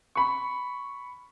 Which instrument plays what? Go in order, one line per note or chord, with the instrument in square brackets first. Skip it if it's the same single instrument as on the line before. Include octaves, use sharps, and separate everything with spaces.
[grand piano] B5 C#6